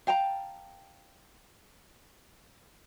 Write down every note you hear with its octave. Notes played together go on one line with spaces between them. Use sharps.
F5 G5 A5 A#5